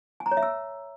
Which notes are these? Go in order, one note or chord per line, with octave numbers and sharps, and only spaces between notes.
G#5
A#5
C#5
E5
E6